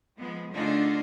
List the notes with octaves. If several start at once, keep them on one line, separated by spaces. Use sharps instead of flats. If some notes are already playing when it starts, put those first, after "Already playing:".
F3 G#3 B3
D3 A3 D4 D#4 F4 G#4